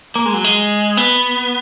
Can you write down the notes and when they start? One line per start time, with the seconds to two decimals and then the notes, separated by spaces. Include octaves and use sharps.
0.16 A#3
0.26 G#3
0.34 F#3
0.44 G#3
0.97 B3